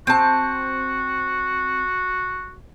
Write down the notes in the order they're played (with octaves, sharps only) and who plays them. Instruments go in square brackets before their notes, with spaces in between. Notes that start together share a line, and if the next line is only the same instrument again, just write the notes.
[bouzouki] C4 A5 [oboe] F#4